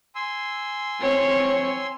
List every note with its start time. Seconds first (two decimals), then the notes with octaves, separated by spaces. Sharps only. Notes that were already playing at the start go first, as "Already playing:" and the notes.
0.15 G#5 C6 E6
1.00 C4 C#5